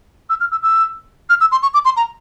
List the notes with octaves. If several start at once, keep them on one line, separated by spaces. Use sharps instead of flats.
E6
F6
E6
E6
F6
E6
C6
C#6
D6
C6
A#5